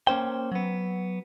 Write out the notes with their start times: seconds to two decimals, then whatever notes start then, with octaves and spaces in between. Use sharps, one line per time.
0.07 A#3 C#4 C5 G5
0.52 F#3 B3